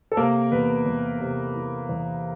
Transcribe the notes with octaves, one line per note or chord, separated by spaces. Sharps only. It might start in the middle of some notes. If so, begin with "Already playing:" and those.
A4
C3 A#3 A#4
E2 B3 B4
E2
C3
E3
E2